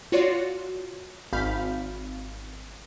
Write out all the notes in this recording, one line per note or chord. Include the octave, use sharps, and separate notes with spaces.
F4 F#4 C#5 D5 C6
G#1 F5 B5 F6 G6 B6